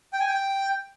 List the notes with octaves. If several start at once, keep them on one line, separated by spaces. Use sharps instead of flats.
G5
G#5
G5